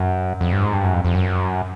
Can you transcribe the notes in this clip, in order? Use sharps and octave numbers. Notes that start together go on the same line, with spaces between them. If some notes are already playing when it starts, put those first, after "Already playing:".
Already playing: F#2
F2
G2
G#2
G2
F#2
F2
F2
F#2